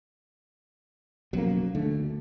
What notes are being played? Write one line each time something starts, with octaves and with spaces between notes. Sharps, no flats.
B1 F#2 B2 F3 F#3 A#3
D2 D3 A3